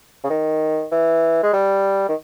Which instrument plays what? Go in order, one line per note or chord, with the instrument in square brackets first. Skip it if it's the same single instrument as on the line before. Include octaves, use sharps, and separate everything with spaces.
[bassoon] C#3
D#3
E3
G#3
G3
D#3